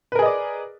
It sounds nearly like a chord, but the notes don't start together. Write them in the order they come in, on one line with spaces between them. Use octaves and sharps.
B4 A#4 G#4 D#5 D5